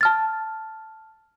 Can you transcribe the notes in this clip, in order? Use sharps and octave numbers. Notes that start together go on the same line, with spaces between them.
A5 F6 A6